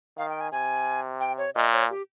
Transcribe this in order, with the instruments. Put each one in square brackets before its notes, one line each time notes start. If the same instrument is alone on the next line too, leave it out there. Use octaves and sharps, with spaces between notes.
[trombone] D#3 [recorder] F5
[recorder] G5
G#5
[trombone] C3 [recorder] G#5
[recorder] G5
C#5
[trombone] A#2 [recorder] D#5
[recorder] C#5
G4